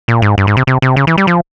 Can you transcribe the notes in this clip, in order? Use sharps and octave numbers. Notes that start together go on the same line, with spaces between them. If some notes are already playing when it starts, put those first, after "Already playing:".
A#2
G#2
G2
G#2
C3
C3
C3
C#3
E3
G3
F3